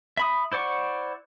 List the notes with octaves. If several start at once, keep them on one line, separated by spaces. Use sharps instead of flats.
E5 B5 D#6
E4 C5 D5 F#5 C#6